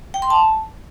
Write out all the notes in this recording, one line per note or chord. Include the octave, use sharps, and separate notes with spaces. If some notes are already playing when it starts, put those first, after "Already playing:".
G5
C6
A5